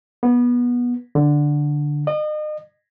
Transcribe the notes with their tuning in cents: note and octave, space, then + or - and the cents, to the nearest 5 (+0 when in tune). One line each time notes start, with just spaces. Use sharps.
B3 -20
D3 +0
D#5 -35